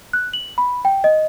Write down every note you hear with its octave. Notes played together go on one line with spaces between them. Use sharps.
F#6
F#7
B5
G5
D#5